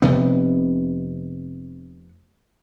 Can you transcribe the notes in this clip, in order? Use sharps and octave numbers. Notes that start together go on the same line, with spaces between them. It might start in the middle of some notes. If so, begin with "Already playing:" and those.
F1 C3 B3